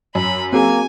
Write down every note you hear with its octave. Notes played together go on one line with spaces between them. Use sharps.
F#2 B5
A#3 C4 F#4 G#4 G#5